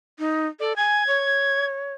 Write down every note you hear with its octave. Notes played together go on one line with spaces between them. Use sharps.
D#4
A4 D5
G#5 G#6
C#5